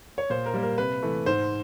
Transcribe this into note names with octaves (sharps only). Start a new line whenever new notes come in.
C#5
A#2 C5
A#4
G3 A#3
A#4
C3 B4
E3 A3
G#2 C5